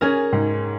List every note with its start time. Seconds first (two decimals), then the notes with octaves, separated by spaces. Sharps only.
0.01 C#4 G#4 A#4
0.33 G#2